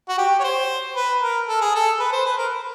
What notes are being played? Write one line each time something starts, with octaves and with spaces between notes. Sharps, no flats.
F#4
G4
C#5
C5
B4
A#4
A4
G#4
A4
B4
C5
B4
A#4